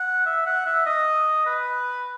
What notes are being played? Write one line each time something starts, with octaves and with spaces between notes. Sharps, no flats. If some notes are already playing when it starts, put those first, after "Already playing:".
Already playing: F#5
E5
F#5
E5
D#5
B4